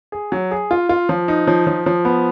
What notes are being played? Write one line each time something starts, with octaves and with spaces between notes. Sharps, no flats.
G#4
F#3
G#4
F4
F4
F3
D#4
F3
F3
F3
B3